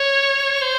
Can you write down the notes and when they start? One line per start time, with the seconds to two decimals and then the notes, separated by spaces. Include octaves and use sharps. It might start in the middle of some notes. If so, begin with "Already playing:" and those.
Already playing: C#5
0.61 C5